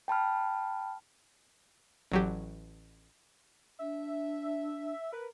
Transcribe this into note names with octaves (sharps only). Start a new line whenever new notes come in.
G5 A5 B5 F6
A1 F#3 G4
D4 E5
A#4 B4